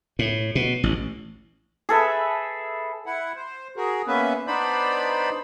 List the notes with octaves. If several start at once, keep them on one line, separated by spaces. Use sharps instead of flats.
A2
B2
A1
G#4 A4 B4 E5
E4 F#5
C5
F#4 G#4 A#4
A#3 B3 C#4 B4 E5
B3 D4 D#4 C5 D5 B5